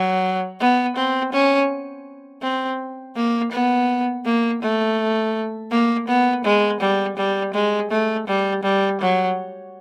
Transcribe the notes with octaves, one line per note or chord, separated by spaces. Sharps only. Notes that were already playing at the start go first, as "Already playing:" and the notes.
Already playing: F#3
B3
C4
C#4
C4
A#3
B3
A#3
A3
A#3
B3
G#3
G3
G3
G#3
A3
G3
G3
F#3